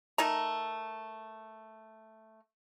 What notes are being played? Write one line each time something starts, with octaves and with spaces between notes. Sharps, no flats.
A3 D#4 A#4 A#5